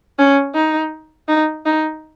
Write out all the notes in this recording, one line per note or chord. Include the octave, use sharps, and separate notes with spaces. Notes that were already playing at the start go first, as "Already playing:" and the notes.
C#4
D#4
D#4
D#4